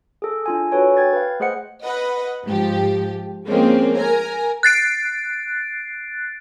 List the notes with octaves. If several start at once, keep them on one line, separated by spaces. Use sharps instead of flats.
G#4 A4
D4 F4 G#5
D4 F#4 A4 B4 C#5 G#5
G5 G#6 A6
B4 F5
A3 G#4 C5 D#5 F#5 C#7
B4 D#5 F#5
G#2 F3 G4
F3 G#3 A#3 C4 C#4
A#4 G#5 A#5
F#6 A6 C7 D7